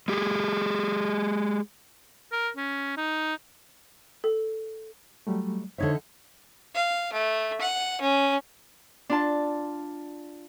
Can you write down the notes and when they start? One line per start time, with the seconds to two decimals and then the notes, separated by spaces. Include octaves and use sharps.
0.08 G#3 G4 G#4
2.32 A#4
2.57 C#4
2.97 D#4
4.24 A4
5.27 F#3 G3 A3
5.78 D3 D#4 C5 C#5 E5 G#6
6.75 F5
7.13 A3
7.61 F#5
8.01 C#4
9.10 D4 F4 A5